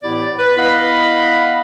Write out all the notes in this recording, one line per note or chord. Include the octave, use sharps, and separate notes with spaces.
A2 E3 B3 E4 G4 D5
B4
B3 E4 D#5 F5 F#5 B5